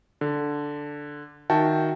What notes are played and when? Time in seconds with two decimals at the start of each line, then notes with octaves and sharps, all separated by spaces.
0.21 D3
1.50 D#3 F#4 E5 G5 A5